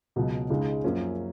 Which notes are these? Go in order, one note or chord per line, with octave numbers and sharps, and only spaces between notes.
C#2 B2 F#3
C#2 C#3 G#3 D#4
F#2 F3 A#3 C#4